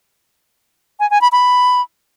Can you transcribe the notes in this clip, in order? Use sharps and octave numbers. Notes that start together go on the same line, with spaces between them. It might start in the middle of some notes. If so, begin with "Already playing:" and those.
G#5
G#5
B5
B5